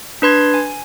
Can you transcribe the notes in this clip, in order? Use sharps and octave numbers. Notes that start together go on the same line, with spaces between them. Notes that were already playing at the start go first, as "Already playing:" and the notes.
D4 B4 C6 G#6
G#5